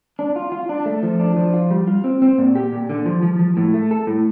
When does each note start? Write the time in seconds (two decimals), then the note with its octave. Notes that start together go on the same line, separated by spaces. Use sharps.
0.19 D4
0.36 F4
0.52 F4
0.69 D4
0.86 A3
1.03 F3
1.20 D4
1.37 F3
1.54 F4
1.71 G3
1.87 F4
2.04 C4
2.22 C4
2.38 A#2
2.55 G4
2.72 A#2
2.90 D3
3.06 F3
3.23 F3
3.39 F3
3.57 A2
3.74 A3
3.91 A4
4.07 A2